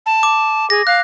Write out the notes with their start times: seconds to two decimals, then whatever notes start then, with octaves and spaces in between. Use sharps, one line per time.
0.06 A5
0.23 D6
0.70 G#4 A#6
0.87 F5 F#6